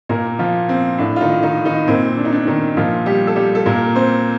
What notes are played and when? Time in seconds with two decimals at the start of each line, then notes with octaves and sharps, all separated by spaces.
0.09 A#2 A#3 A#4
0.39 F3 F4
0.69 C4
0.99 A2 D4
1.16 F4
1.21 D#3 D#4
1.43 D#3 D#4
1.65 D#3 D#4
1.87 A#2 C4
2.17 D4
2.25 D#4
2.33 D4
2.47 D#3 D#4
2.77 A#2 F3 F4
3.06 G3 G4
3.27 A4
3.36 G3 G4
3.55 A4
3.66 A#2 A#3 A#4
3.95 C4 C5